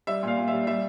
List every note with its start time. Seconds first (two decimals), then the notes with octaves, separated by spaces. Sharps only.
0.07 G3 E5
0.23 A#2 F5
0.37 A#2
0.48 E5
0.53 G3
0.67 G3 E5